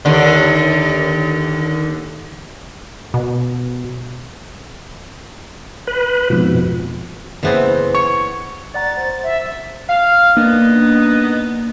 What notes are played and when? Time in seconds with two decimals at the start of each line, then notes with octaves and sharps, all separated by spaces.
0.05 D#2 D3
3.14 B2
5.87 B4
6.30 F2 G#2 B2 F3
7.43 F#1 E3 B3 C4 G#4 C5
7.95 C#5 C#6
8.75 D5 F#5 A#5 A6
8.97 C5 A6
9.23 E5
9.89 F5
10.37 A#3 B3 D4 D#4 D#5